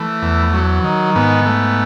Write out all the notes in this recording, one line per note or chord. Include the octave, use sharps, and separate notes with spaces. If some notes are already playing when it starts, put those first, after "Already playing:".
Already playing: E3 A3
E2
F#3
D#3
G#2 B3
A3